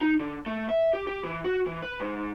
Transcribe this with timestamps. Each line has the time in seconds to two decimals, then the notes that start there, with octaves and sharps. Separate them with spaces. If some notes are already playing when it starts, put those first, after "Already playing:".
0.01 D#4
0.20 D3
0.46 A3
0.69 E5
0.93 G4
1.07 G4
1.23 E3
1.44 F#4
1.66 E3
1.82 B4
2.00 G#2